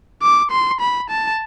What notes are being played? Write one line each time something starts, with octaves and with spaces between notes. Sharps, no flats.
D6
C6
B5
A5